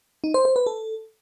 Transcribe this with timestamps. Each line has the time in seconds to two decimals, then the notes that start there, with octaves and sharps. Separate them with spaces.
0.24 D#4
0.34 C5
0.45 C5
0.56 B4
0.66 A4